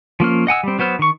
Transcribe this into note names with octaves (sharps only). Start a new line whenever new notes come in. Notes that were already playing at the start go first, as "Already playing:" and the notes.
F3 A#3 C#4 F6
D#5 F#5 G#5 E6
G3 C4
F#3 B3 C5 F6
D#3 C#6